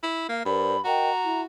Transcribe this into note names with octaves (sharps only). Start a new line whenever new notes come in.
E4
A#3 F5
G2 A#4 C5 D5 B5
F#4 A#4 D#5 G5 A#5
E4